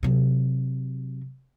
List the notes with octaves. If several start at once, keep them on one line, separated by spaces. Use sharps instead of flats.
C3 F#3